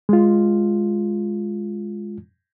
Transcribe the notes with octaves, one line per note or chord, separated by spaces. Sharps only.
G#3 F4